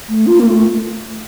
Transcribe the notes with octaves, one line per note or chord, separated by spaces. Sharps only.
A3
F4
A#3
A3